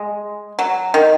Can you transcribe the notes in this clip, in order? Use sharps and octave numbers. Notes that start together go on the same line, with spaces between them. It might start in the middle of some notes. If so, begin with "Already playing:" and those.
Already playing: G#3
F#3
D#3